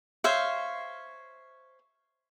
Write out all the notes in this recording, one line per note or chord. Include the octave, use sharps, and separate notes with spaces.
C5 C#5 E5 F5